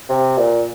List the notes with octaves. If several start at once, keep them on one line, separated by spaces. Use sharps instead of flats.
C3
A#2